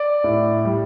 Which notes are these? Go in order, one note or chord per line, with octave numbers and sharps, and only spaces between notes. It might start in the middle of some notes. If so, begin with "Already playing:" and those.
Already playing: D5
A2
G3